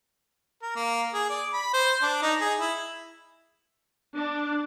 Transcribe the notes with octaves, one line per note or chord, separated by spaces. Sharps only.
A#4
A#3
G#4
D5
B5
C5
D4
D#4
G#4
E4
D4